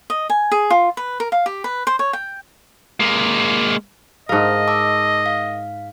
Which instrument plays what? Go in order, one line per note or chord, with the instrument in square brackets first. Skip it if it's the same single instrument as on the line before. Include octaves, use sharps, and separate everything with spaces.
[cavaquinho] D#5
G#5
G#4
F4
B4
A#4
F5
G4
B4
C5
C#5
G5
[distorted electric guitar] G#3 A#3
[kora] G#2 A#4 [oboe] D#5 [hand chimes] F5 A5
[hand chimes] A5 D6 E6
F5